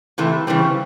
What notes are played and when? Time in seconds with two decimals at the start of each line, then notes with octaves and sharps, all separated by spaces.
0.18 C3 E3 A3
0.47 C#3 E3 G3 C4